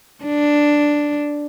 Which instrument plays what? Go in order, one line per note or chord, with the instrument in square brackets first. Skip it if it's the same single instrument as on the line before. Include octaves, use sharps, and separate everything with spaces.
[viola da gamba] D4